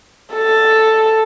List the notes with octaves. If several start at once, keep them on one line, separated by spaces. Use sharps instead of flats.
A4